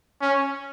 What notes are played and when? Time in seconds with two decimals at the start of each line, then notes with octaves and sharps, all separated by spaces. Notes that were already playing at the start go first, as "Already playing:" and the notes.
0.21 C#4